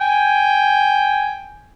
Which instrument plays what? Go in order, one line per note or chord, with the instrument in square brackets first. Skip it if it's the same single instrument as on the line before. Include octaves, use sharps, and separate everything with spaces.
[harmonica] G5 G#5